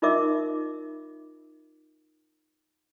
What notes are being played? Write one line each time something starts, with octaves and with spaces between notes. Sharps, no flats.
D#4 F4 A#4 D#5 E5 D6